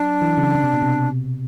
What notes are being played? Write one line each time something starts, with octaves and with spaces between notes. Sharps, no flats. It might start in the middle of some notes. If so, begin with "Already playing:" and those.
Already playing: F#3 D4
E3
C#3
C#3
C3
B2
C3